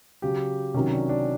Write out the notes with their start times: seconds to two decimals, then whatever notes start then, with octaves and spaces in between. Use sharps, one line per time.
0.22 C#3 F#3 G4
0.74 C3 D#3 F#3 C#4
0.92 D4
1.09 D4